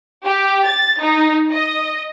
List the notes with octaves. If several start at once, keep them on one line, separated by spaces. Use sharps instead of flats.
G4
A6
D#4
D#5